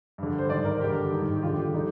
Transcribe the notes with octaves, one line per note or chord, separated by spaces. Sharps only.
G2 D3
C5
G#2 D#3 D5
A#4
G2 D3 G4
G#2 D#3
G4
G2 D3 F4
G4
D3 D#4